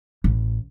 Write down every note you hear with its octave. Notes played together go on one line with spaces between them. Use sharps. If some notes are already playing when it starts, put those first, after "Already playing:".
A1